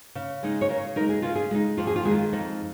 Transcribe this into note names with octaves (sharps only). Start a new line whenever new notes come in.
C#3
G#3 D#4
C#5
C#3 A#4
G#3 D#4 A#4
G#4
C#3 F4
G#4
G#3 D#4
F2 F4
G#4
F4
D#3 G#3 G#4
F4
F2 D#4